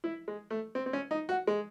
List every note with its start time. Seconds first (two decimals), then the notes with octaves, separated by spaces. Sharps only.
0.04 E4
0.28 G#3
0.50 A3
0.75 C4
0.86 C4
0.93 C#4
1.11 D#4
1.29 F#4
1.47 G#3